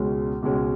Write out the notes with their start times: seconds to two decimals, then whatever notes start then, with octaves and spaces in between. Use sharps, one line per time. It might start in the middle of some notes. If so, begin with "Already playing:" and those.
Already playing: C#2 B2 G#3 C#4
0.42 C#2 B2 G#3 C#4